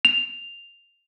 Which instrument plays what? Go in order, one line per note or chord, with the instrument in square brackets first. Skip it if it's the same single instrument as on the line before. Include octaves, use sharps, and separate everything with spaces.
[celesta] F7